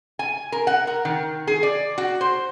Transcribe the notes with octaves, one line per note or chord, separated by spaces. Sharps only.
G#5
A#4
F#5
A#4
D#3
G#4
D5
F#4
C5